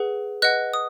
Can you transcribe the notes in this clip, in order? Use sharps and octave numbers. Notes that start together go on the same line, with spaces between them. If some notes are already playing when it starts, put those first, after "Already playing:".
Already playing: G#4 B4 F#5
B4 D#5 F#5 F#6
D#6